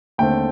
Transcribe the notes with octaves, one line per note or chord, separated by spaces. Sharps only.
D#2 D3 A3 C4 G5